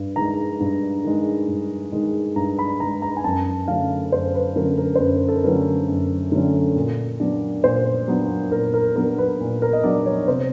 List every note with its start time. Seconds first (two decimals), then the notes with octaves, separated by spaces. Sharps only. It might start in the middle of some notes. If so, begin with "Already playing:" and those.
Already playing: G2
0.16 D#3 G#3 A#5
0.60 G2
1.04 D#3 G#3
1.48 G2
1.92 D#3 G#3
2.36 G2 A#5
2.59 B5
2.80 D#3 A#5
2.84 G#3
3.02 A#5
3.17 G#5
3.24 F#2 A5
3.68 D3 F#3 A3 C#4 F5
4.12 F#2 C5
4.34 B4
4.56 D3 F#3 A3 C#4 A#4
4.78 A#4
4.95 C5
5.00 F#2 B4
5.29 A4
5.36 A#4
5.44 D3 F#3 A3 C#4 B4
5.88 F#2
6.32 D3 F#3 A3 C#4
6.76 A#2
7.20 F#3 B3 D4
7.64 A#2 C5
8.08 F#3 B3 D4
8.52 A#2 A#4
8.74 A#4
8.96 F#3 B3 D4 A#4
9.18 B4
9.41 A#2
9.62 A#4
9.73 D#5
9.84 F#3 B3 D4 D5
10.06 C#5
10.28 C3 C5